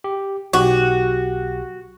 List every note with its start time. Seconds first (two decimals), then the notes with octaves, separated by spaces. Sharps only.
0.04 G4
0.53 B1 F#4 G4